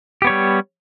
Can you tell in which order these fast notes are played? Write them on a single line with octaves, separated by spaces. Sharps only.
G4 B3 C#5 G3